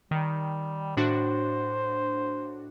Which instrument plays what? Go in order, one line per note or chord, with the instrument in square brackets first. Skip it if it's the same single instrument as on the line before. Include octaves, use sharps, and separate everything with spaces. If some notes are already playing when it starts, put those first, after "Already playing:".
[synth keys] D#3 [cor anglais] G3
[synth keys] A2 D4 F#4 [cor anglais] C5